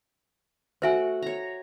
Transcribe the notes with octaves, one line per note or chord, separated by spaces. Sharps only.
A3 F#4 C5 E5 F#5 G#5
C#5 A#5